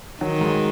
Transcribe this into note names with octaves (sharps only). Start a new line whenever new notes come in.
D#3 F#3
G#2